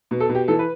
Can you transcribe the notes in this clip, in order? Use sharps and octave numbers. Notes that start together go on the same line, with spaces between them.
B2
A4
B2
G4
E3 A4
B4